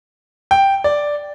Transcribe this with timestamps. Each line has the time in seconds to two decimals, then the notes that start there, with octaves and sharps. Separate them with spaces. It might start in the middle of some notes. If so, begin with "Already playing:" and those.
0.51 G5
0.84 D5